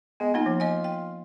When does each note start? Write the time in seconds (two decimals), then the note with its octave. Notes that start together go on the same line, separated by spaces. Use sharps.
0.20 G#3 B3
0.34 A#3 D#4 F4 G#5
0.46 F3
0.60 D#5 G#5
0.84 G5